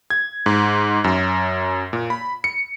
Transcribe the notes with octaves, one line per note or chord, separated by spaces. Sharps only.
G#6
G#2
F#2
A#2
B5
C#7